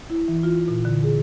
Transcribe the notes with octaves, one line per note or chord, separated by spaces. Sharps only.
E4
E3
F4
A#2
D3
G#4